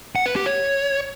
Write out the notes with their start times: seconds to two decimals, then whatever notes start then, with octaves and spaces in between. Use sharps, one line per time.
0.16 F#5
0.26 B4
0.36 G4
0.46 C#5